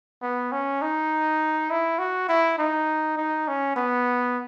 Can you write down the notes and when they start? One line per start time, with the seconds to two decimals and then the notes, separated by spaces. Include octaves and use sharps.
0.22 B3
0.52 C#4
0.82 D#4
1.70 E4
1.99 F#4
2.29 E4
2.58 D#4
3.17 D#4
3.48 C#4
3.76 B3